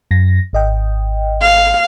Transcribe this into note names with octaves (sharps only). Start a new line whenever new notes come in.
F#2 A#6
G#1 D#5 G5
F5